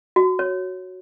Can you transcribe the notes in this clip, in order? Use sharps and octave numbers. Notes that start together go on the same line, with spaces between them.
F#4
C#5